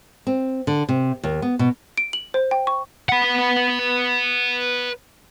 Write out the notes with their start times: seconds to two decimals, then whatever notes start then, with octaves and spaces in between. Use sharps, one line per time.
0.27 C4
0.67 D3
0.89 C3
1.24 D#2
1.42 B3
1.59 B2
1.97 D7
2.13 F#7
2.34 C5
2.51 G5
2.67 C#6
3.09 B4 F#5